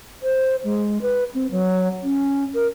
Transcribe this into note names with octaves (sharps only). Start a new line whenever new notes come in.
C5
G#3
B4
C4
F#3
C#4
A#4